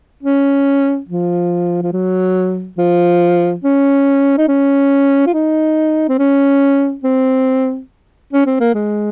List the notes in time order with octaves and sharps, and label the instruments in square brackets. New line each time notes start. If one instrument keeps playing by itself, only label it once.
[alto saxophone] C#4
F3
F3
F#3
F3
C#4
D#4
C#4
F4
D#4
C4
C#4
C4
C#4
C4
A#3
G#3